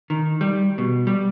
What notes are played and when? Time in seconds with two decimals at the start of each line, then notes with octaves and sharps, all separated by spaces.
0.10 D#3
0.41 G3
0.78 B2
1.07 G3